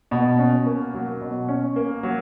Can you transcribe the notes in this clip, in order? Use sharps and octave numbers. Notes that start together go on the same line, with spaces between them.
B2
C#4
A#3
F#3
B2
C#4
A#3
F#3